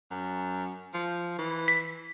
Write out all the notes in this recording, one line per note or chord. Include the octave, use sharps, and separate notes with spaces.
F#2
F3
E3
B6